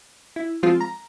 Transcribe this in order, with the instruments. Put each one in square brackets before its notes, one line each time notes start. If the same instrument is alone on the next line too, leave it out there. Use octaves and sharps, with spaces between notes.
[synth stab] E4
F3 G#3 C4 F4
A#5